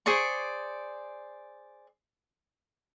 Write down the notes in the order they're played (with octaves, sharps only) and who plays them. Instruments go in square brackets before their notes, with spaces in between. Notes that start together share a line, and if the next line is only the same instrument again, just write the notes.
[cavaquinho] G#4 C5 D5 C#6